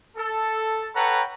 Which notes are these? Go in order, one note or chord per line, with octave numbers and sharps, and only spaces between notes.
A4
A4 B4 C#5 F#5 G5 A#5